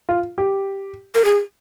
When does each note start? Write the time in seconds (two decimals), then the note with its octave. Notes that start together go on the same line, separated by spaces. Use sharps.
0.09 F4
0.38 G4
1.15 A#4
1.25 G#4